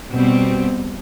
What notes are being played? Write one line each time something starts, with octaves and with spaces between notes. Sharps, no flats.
B2 G3 C4